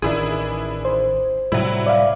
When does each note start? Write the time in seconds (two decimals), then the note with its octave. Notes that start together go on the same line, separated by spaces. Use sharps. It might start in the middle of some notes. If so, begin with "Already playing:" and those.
0.02 A1 D#3 D4 E4 G#4
0.85 C5
1.52 A2 C3 F#3 G3 E4
1.86 D5 E5 F5